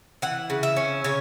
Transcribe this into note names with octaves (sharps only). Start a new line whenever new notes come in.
E3 F#5
C#3
E5
C#4
C#3 C#5